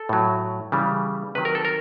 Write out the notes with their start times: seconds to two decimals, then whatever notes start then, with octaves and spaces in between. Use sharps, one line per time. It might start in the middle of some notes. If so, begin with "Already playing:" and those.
Already playing: A4
0.09 A2 F#3
0.72 C#3 E3 G3
1.35 C3 D#3 F#3 B4
1.45 A#4
1.55 A4
1.65 A#4